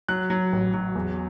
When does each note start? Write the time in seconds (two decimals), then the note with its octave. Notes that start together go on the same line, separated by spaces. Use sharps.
0.08 F#3 F#6
0.30 F#3
0.53 A1
0.74 F#3
0.95 E2